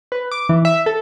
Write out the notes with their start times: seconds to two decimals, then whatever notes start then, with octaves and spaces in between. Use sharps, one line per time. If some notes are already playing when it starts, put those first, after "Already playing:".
0.12 B4
0.31 D6
0.49 E3
0.65 E5
0.86 A4